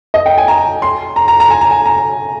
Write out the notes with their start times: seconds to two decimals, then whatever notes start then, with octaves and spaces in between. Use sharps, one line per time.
0.14 D#5
0.26 G5
0.38 G#5
0.48 A#5
0.82 C6
1.16 A#5
1.28 A#5
1.40 A#5
1.50 G#5
1.61 A#5
1.71 G#5
1.85 A#5